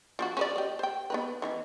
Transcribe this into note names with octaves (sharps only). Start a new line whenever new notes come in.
F3 D4 F#4
C#4 B4 D5
G4 D#5
C5 G5
B3 D#4 B4
D#3 E3 C#4